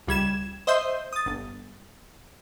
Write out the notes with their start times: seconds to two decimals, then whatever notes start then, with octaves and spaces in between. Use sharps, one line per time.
0.08 C#2 G3 G#6 E7
0.67 C5 D#5 E5 C6 G6
1.13 D#6 A6
1.26 G1